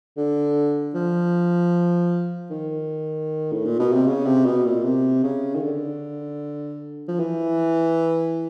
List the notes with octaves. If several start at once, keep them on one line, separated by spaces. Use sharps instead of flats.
D3
F3
D#3
A2
A#2
B2
C3
C#3
C3
B2
A#2
C3
C#3
D#3
D3
F3
E3